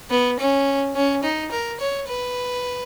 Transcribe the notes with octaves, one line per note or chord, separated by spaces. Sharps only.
B3
C#4
C#4
D#4
A#4
C#5
B4